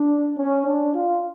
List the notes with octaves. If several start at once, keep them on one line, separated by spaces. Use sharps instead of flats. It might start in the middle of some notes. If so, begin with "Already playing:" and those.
Already playing: D4
C#4
D4
F4